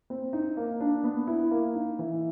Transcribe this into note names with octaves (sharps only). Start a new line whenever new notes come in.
C4
D#4
A#3
D4
B3
E4
A#3
D#4
E3